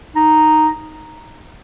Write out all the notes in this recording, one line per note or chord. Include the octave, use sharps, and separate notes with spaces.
D#4